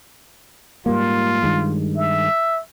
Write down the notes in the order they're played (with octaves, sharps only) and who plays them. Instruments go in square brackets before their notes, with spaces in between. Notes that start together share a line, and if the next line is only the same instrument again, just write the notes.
[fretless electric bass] G#2 G3 A#3 [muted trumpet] F4
[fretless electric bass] G2 D#3 G#3
[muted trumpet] E5